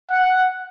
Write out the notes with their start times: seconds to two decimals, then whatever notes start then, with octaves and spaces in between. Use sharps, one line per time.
0.10 F#5